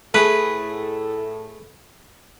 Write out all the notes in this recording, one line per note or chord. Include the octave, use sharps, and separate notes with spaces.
A2 A3 G#4 A4 B4